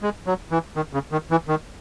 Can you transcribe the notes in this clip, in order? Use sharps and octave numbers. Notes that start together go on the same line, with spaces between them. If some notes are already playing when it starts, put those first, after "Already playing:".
G#3
F#3
E3
D#3
C#3
D#3
E3
D#3